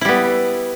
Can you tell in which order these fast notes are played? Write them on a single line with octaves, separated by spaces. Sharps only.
E4 G3 B3